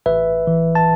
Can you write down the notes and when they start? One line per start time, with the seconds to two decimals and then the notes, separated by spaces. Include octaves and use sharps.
0.06 A1 B4 E5
0.47 E3
0.75 A5